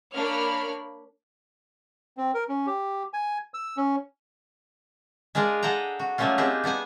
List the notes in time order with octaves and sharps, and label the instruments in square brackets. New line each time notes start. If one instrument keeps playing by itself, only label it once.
[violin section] A#3 D4 C#5 B5 F6
[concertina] C4
A#4
C#4
G4
G#5
E6
C#4
[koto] G#3 D4 F4 G#4 A#4
G#4 A4 F#5 G5 A#5
F#4
F#3 G3 A3 A#3 C#4 F4
C4 D4 D#4 G4 G#4
B3 D4 F#5 G#5